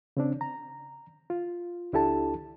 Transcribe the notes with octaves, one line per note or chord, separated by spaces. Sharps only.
C#3 C4 D4
A#5
F4
C#2 D4 E4 G4 A4 A5